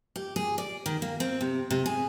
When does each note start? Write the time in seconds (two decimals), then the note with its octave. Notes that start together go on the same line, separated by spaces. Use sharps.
0.16 G4
0.36 G#4
0.58 D5
0.86 D#3
1.02 A#3
1.20 C4
1.41 C3
1.71 C3
1.86 G#4